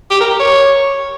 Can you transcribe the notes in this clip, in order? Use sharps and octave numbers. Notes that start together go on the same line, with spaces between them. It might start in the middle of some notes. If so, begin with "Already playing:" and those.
G4
A#4
G4
C#5